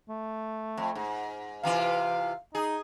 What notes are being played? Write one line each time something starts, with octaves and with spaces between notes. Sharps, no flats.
A3
F2
G#2
C3 E3 F4 F5
D#4 G#4